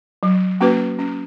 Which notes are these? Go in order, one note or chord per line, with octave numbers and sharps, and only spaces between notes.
F#3
A#3 C#4 F#4 B4
C#4